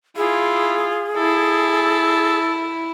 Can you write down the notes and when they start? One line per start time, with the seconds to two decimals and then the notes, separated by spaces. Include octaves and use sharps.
0.17 E4 F4 G#4
1.17 E4 A4